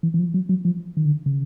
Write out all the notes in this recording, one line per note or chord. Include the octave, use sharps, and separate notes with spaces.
E3
E3
F3
F#3
F#3
F3
D#3
D3
C#3